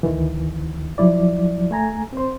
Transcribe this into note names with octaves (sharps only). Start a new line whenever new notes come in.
D2 D#3 E3
F3 F#3 E4 D5
A3 G#5 A#5
C4 C5